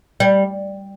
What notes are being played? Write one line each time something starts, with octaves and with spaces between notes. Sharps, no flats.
G3